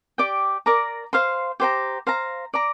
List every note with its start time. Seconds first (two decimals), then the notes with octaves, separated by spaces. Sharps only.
0.18 G4 D5 G5 D6
0.66 A#4 D5 A#5 D6
1.13 C5 F5 C6
1.60 G4 C5 G5 A#5
2.07 C5 F5 A#5
2.54 D5 A#5 D6